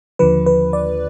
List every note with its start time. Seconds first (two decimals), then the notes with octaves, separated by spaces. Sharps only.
0.19 D#2 D3 F3 B4
0.46 B4
0.73 D5